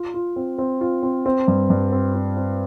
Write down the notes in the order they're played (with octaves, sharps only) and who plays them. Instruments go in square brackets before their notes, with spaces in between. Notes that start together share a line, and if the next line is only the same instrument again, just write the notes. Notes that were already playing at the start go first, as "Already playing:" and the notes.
Already playing: [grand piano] F4
F4
C4
C4
F4
C4
C4
G2
G2
C4
C4
C4